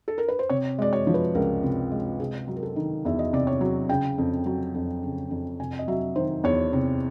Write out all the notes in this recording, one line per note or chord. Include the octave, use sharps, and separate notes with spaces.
A4
A#4
B4
C5
C3 C#5
G#3 D5
C#5
F3
B4
C#2 A#4
C3
G#3
C3 G#4
F#3
A#4
A4
D#3
E2 E5
D#5
C3 D5
C#5
F#3
C#3 G5
F2
F#3
F2
C#3
F2
C3 G#5
D#5
F#3 E5
D#3 C5
E2 C#5
C3